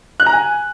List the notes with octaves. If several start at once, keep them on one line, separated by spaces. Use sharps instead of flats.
F#6
A#5
G#5